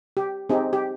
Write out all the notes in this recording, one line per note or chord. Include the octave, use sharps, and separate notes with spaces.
G4
C4 D#4 G4 G#4
G4